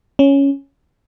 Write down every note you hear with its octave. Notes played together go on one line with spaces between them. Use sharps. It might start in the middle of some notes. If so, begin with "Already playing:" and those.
C#4